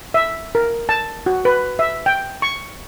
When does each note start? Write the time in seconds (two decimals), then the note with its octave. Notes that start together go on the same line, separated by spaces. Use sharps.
0.14 E5
0.55 A#4
0.89 A5
1.26 F#4
1.45 B4
1.79 E5
2.06 G5
2.42 C#6